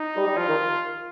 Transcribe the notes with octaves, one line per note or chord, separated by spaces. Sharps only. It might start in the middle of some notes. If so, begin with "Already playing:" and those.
Already playing: D#4
G3
G3
F3 F4
D#3